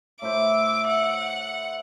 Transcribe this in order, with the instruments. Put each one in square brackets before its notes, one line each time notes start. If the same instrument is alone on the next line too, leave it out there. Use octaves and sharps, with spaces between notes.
[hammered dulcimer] A2 E4 C5 [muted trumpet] E5 [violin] D6
[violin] F#5